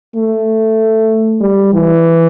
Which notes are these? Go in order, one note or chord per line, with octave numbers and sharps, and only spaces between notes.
A3
G3
E3